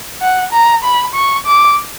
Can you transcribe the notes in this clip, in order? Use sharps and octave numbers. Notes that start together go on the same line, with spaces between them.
F#5
A#5
B5
C#6
D6